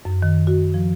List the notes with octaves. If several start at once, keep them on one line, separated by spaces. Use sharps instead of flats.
F#2
D#3
F#4
F3